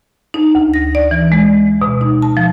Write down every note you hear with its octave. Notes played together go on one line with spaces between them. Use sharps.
D#4
D2
A#6
D5
E3
G#3
B2
D#4
A5
F3